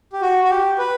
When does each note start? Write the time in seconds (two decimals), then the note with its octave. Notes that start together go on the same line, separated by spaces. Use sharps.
0.13 G4
0.22 F#4
0.44 F#4
0.50 G4
0.78 B4